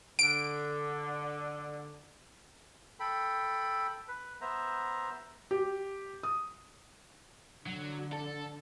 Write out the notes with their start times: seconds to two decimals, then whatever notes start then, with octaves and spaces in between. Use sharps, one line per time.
0.19 D3 D7
3.00 A4 G5 B5
4.08 B4
4.41 B3 C5 E5 A#5
5.51 G4
6.23 D#6
7.67 D3 F#3
8.13 A4